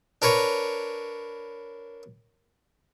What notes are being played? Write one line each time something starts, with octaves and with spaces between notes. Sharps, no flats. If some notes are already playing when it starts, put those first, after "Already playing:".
D4 A#4 B4 C#5